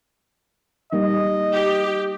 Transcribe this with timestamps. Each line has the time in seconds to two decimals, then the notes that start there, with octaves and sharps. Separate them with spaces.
0.93 G3 A#3 D#4 D#5
1.53 G4